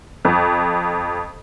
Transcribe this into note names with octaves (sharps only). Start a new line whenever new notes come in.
F2